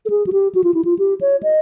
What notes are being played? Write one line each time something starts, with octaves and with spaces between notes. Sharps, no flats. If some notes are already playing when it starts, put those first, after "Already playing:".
A4
G#4
F#4
G4
F#4
F4
E4
F4
G4
C#5
D#5